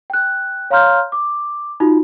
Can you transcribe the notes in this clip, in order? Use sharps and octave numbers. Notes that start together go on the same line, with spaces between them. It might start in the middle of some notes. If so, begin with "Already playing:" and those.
G5 F#6
C#5 F5 A#5 C6 F6 G6
D6
D#4 F4 F#4